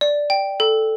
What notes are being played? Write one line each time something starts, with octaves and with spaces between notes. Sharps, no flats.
D5
G5
A4